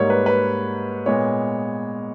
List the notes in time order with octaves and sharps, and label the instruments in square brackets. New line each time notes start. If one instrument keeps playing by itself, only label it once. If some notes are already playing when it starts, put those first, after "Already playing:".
Already playing: [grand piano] G#2 G3 A#3 C#5
B4
B4
A#2 G#3 B3 C#5